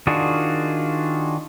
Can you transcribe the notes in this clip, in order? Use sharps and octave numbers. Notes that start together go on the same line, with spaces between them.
D#3 D4 F4 F#4 G#4